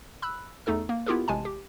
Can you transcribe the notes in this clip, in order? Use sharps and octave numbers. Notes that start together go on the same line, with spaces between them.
B5 E6 F#6
E2 A3 D#4 A4 E6
A#3
B3 E4 F4 G4 G#4 A#4
A1 C3 G#3 G#5 A5
G4